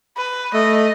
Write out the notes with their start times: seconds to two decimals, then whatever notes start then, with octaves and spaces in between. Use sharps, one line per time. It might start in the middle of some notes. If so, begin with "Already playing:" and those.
0.17 B4
0.54 A3 D#5